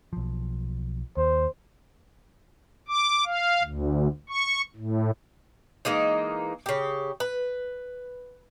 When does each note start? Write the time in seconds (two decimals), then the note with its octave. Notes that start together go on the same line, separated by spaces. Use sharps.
0.13 B1 F3
1.17 D#2 C5
2.88 D6
3.25 F5
3.63 D2
4.29 C#6
4.76 A2
5.85 E3 G#3 A#3 D#4
6.66 C#3 G4
7.20 B4